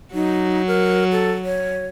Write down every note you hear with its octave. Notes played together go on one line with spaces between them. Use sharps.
F#3 D#4
A#4
A4
C#5